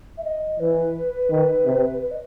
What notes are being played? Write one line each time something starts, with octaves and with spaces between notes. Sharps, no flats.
E5
D#5
E3 B4
D#3
C3
B4
D#5